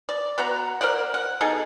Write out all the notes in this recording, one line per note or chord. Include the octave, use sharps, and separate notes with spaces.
D5
B3 F#4 F#5 A#5
A#4 C5 D5 F#5
F#5
B2 D#4 G#4 A4